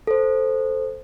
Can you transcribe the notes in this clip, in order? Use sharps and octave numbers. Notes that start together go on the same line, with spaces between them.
A4 C5